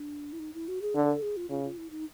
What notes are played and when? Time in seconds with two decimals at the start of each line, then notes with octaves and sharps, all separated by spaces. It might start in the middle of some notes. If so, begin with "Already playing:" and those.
Already playing: D4
0.33 E4
0.39 D#4
0.54 E4
0.68 F#4
0.82 G#4
0.95 D3 A4
1.08 A4
1.22 G#4
1.37 F4
1.50 C#3 F4
1.64 F4
1.78 E4
1.91 D#4